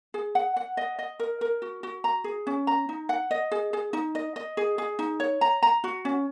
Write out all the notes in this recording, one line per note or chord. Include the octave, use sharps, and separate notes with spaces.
G#4
F#5
F#5
D#5
D#5
A#4
A#4
F#4
F#4
A#5
G#4
C#4
A#5
D#4
F#5
D#5
G#4
G#4
D#4
D#5
D#5
G#4
G#4
D#4
C#5
A#5
A#5
F#4
C#4